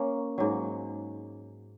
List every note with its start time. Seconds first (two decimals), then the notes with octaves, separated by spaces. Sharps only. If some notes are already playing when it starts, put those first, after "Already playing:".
Already playing: A#3 C#4
0.38 G#2 F#3